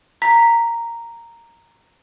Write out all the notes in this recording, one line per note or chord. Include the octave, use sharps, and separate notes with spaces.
A#5 B6